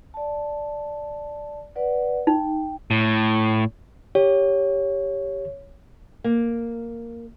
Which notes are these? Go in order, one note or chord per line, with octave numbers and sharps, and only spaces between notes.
D5 A5
B4 D5 F#5
D#4 G5
A2
G4 C#5
A#3